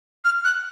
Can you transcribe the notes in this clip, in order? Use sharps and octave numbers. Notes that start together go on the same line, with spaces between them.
F6
F#6